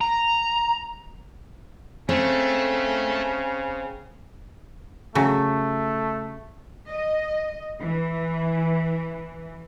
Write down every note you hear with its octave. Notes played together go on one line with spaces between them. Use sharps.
A#5
C#3 A3 C4
C#3 F#3 A3
D#5
E3